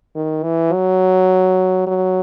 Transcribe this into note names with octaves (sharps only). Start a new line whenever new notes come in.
D#3
E3
F#3
F#3